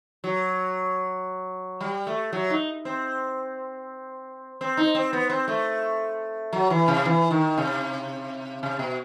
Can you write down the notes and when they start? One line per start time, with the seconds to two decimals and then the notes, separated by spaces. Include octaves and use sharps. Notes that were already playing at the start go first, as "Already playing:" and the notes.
0.24 F#3
1.81 G3
2.07 A3
2.32 F#3
2.50 D#4
2.85 C4
4.61 C4
4.77 D#4
4.95 C4
5.13 B3
5.30 C4
5.48 A3
6.53 F#3
6.70 E3
6.88 C3
7.05 E3
7.31 D#3
7.58 C3
8.63 C3
8.79 B2